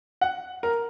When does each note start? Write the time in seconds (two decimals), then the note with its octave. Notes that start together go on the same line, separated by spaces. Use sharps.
0.21 F#5
0.63 A#4